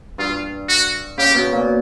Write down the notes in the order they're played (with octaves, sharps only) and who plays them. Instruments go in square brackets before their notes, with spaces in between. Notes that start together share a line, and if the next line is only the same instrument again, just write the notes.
[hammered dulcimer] G2 [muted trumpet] F4
[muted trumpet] F#4
[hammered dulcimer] C#3 [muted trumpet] G4
[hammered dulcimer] B2
A#2